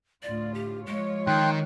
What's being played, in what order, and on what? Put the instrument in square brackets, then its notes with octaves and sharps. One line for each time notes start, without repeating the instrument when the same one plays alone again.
[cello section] D2 A2 F4 [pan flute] D5
[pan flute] G4
[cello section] F3 F4 C#5 [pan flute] G#3
[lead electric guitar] D#3 [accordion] G5 C6 F#6